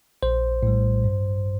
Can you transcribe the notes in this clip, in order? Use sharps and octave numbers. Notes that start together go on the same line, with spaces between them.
A#1 C5
A2 G3
G2